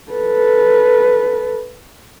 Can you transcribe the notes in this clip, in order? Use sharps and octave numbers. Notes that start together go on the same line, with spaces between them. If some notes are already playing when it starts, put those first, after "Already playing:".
A4 B4